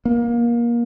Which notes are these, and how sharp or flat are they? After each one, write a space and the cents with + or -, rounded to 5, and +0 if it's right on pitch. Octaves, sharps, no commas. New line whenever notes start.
A#3 +25